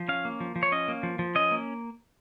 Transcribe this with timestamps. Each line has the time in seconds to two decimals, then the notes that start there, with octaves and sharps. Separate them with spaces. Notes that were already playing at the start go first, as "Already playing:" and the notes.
Already playing: F3
0.08 C#4 F5
0.25 A#3
0.40 F3
0.56 F3
0.63 C#5
0.72 C#4 D#5
0.88 A#3
1.03 F3
1.19 F3
1.35 C#4 D#5
1.51 A#3